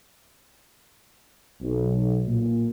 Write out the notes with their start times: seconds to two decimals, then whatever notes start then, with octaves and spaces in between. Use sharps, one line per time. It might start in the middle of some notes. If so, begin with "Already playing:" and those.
1.61 B1
2.27 A#2